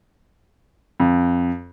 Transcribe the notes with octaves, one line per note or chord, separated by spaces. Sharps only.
F2